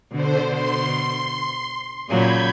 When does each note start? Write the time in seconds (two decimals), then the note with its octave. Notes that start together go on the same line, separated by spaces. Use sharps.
0.11 B2 D3 C5
0.49 C6
2.08 A#2 C#3 F#3 B5 G6 G#6